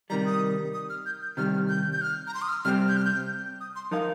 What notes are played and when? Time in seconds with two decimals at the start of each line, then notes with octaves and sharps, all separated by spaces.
0.10 C3 D#3 G3 A#5
0.26 D#6
0.74 D#6
0.90 F6
1.06 G6
1.22 G6
1.37 C3 D#3 G3 F6
1.54 F6
1.69 G6
1.92 G6
2.01 F6
2.27 A#5
2.34 C6
2.42 D#6
2.49 F6
2.65 C3 G3 C4 G4 C5 F6
2.88 G6
2.97 F6
3.05 G6
3.60 D#6
3.76 C6
3.91 F3 D#4 A#4 F5 D#6